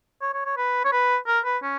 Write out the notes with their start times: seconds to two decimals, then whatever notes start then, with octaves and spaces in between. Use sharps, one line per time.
0.22 C#5
0.34 C#5
0.46 C#5
0.57 B4
0.85 C#5
0.92 B4
1.27 A#4
1.45 B4
1.63 C#4